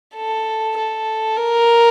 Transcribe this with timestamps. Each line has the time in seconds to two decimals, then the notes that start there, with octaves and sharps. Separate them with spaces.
0.15 A4
0.77 A4
1.37 A#4